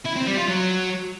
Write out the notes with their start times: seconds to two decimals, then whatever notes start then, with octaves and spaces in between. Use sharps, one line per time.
0.06 E4
0.17 C4
0.27 G3
0.38 F4
0.49 F#3